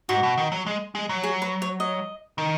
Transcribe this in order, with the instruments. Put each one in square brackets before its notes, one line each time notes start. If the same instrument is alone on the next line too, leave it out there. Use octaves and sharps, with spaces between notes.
[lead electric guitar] G#2 [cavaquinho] F#4
[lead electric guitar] B2
D#3
F#3
G#3
G#3
F#3
[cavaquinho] G#4
B4
C#5
D#5
[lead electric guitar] D#3